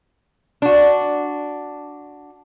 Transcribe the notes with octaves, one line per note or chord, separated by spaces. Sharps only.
D4 F#4